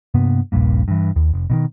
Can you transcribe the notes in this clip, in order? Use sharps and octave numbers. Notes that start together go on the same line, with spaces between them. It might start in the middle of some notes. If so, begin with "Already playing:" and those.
G2 C3 A#3 B3
D#1 A#1 G2 A#3
G2 E3
D#2
F1
B2 D3 D#3